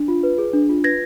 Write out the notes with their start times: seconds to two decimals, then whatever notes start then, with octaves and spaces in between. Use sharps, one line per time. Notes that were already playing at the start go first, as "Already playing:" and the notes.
Already playing: D4
0.08 F4
0.23 B4
0.38 G#4
0.53 D4
0.69 F4
0.84 B4 G#6 A#6